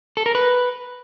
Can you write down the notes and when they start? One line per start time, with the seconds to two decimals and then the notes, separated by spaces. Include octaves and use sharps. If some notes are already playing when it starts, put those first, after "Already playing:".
0.17 A4
0.26 A#4
0.35 B4